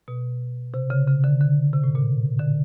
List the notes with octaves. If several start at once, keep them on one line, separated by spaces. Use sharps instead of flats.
B2
C3
C#3
C#3
D3
D3
C3
A2
A#2
D3